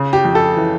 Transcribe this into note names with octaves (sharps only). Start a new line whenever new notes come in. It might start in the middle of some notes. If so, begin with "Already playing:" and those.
Already playing: C#3
G4
F2
A4
E3